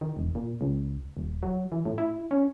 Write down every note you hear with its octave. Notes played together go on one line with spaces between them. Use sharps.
D#3
E1
A#2
C#2
D#1
F#3
E3
A2
E4
C#4